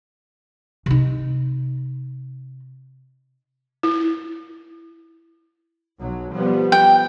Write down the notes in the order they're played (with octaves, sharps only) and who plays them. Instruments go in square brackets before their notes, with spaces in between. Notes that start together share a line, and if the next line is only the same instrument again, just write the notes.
[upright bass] C3 D#4
[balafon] E4
[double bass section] B1 F#3
F3 G3 B3
[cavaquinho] G5